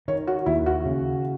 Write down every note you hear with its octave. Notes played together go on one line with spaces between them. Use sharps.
D#3 C#5
F#4
D#2 E4
F#4
C#3